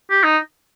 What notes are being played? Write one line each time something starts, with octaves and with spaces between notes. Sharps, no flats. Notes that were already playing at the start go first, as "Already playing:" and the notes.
G4
D#4